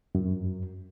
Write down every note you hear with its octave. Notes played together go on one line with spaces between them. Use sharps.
F#2